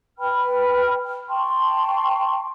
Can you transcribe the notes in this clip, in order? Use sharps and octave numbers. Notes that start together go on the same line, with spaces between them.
B4 G5 B5 F6
G5 A5 C6 C#6